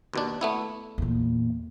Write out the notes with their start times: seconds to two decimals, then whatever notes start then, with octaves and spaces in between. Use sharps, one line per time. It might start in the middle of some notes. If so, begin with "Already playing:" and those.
0.14 D#2 B2 D4
0.41 A3 B3 E4
0.98 E2 A#2